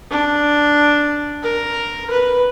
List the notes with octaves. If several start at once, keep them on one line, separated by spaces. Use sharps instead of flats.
D4
A#4
B4